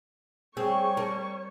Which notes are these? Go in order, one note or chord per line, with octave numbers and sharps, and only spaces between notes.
G3 C4 G#4 C#5 C#6
A#4